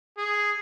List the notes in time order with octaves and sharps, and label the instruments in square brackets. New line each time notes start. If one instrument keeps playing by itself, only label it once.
[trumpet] G#4